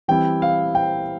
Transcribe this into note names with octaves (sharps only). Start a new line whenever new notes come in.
E3 G3 C4 E4 G5
F5
G5